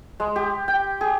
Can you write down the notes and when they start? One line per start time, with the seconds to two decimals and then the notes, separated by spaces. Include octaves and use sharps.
0.20 G#3
0.36 G4
0.68 G5
1.01 G#4